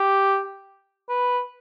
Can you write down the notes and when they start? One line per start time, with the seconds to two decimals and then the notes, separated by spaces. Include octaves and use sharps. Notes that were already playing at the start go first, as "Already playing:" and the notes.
Already playing: G4
1.09 B4